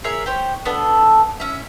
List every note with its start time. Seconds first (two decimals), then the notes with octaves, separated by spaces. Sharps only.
0.04 G#4 A#4 C#5 E5
0.26 G4 C5 C#5
0.65 B3 D4 A4
1.40 C#4 E5